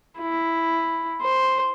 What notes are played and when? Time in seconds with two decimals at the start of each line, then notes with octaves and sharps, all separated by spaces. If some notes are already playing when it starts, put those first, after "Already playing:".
0.19 E4
1.22 C5